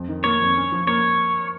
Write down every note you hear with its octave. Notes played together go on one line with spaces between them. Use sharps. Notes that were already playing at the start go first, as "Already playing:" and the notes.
Already playing: F2
D#3
A#3 C#5
F2
C#4
F3
A#3 C#5